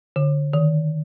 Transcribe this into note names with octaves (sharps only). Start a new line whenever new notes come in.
D3
D#3